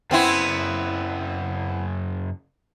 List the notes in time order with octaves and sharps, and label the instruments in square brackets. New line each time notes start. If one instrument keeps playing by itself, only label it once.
[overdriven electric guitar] F#2 C#3 [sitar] B3 C4 E4